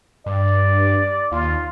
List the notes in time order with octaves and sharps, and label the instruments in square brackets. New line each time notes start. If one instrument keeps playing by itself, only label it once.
[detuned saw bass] G2 [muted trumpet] D5
[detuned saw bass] D#2 [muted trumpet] F4